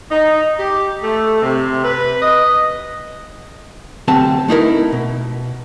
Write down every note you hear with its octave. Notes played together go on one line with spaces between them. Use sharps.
D#4
G4
A3
C3
B4
D#5
D2 C3 F#3 C4 A5
A3 D#4 E4 A#4
B2